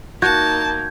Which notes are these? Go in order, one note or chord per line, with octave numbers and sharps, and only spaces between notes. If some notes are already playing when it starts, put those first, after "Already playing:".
A#3 D#4 F#4 A5 G6 G#6